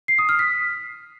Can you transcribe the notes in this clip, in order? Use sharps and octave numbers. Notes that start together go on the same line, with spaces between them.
C7
D#6
F6
B6